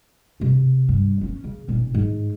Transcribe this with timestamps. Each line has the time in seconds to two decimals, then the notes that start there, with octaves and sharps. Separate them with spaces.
0.40 E1 C3
0.89 G2
1.21 B3 C#4
1.44 C#3
1.68 E1 A#2
1.94 G#2